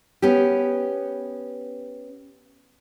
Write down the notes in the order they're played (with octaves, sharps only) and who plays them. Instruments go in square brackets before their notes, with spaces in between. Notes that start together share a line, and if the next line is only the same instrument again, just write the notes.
[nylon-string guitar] B3 C#4 G4